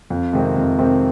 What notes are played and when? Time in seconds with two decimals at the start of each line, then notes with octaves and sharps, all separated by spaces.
0.10 F2
0.33 C3 D#3 G#3 C4
0.57 F2
0.79 C3 D#3 G#3 C4